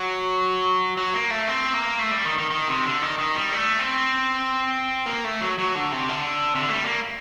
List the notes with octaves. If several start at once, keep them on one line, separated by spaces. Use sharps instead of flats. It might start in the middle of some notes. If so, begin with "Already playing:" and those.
Already playing: F#3
F#3
A#3
A3
C4
A#3
A3
G3
D#3
D#3
D#3
C3
D3
D#3
D#3
G3
A3
C4
A#3
A3
F#3
F#3
D3
C3
D3
C3
D3
A3
G3
A#3